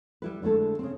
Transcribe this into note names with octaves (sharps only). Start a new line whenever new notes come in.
G3 E4 B4
D3 G#3 A3 E4 A4
C#3 C4